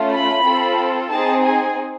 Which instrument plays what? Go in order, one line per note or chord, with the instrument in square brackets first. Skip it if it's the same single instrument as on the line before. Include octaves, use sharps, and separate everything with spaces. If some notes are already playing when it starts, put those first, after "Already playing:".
Already playing: [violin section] A3 C#4 F4
B5
C4 F4 A4
C4 D#4 G#4 A5
G#5